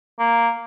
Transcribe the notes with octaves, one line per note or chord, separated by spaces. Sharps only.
A#3